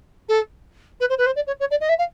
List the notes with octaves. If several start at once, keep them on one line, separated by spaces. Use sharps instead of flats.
A4
B4
C5
B4
C5
D5
C#5
C#5
D5
D#5
E5
F5